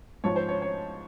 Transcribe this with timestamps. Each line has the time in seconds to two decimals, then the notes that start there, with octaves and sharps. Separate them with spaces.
0.24 G#2 F3 C#5
0.36 C5
0.49 C#5
0.62 C#5